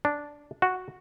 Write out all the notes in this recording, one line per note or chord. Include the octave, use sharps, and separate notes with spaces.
D4
F#4